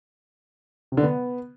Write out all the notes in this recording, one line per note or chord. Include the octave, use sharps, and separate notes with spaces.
C3
D3
B3